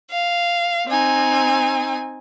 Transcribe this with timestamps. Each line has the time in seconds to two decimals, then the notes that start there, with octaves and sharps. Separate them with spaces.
0.11 F5
0.87 C4 D#4 G#5